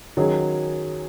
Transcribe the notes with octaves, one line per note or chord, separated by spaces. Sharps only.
D#3 F#3 C#4 G#4